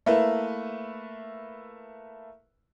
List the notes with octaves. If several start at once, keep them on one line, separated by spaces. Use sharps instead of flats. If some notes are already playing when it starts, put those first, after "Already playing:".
A3 A#3 E4 B4